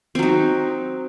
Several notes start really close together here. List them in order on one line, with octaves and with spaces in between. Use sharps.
C4 F#3 D#4